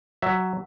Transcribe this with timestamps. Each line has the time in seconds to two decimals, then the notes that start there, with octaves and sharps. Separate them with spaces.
0.22 F#3 E5